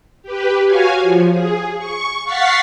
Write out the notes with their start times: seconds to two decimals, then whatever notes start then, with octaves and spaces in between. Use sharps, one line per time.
0.22 G4 B4
0.66 F#4 C#5 F5 G#5
1.02 F3
1.30 G#4
1.77 C#6
2.24 F5 F#5 C#6 A6 B6 C7